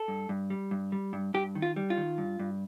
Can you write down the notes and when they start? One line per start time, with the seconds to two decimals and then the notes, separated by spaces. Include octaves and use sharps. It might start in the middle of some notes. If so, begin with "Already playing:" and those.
Already playing: A4
0.08 G2
0.29 G2
0.50 G3
0.71 G2
0.92 G3
1.13 G2
1.34 G2 G4
1.55 D#3
1.62 F4
1.76 G3
1.90 F4
1.97 D#3
2.18 G2
2.40 G2